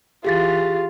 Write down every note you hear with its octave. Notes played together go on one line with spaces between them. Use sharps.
E3 F4 G4 G#4 A6